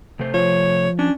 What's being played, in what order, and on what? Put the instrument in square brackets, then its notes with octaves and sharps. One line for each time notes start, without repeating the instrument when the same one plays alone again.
[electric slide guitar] C3 A3 C5
[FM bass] F3 [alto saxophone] C#5
[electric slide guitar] C#4 [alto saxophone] D4